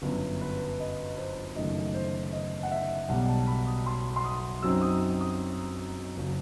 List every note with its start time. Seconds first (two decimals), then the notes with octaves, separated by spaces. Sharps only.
0.02 G1 F#2 F#3 B4
0.41 B4
0.80 D#5
1.18 C5
1.56 F#1 F#2 D#3 A3 D#5
1.94 C5
2.32 D#5
2.63 F#5
2.71 E5
3.09 B1 B2 G3 F#5
3.28 A5
3.47 B5
3.67 D#6
3.86 C6
4.16 C6
4.24 D#6
4.62 F#2 F#3 C4 D#4 E6
4.82 D#6
5.21 D#6
6.16 F#1 F#3